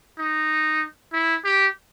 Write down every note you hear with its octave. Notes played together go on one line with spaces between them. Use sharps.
D#4
E4
G4